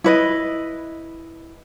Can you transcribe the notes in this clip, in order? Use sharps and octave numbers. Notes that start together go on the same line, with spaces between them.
E4 B4 D#5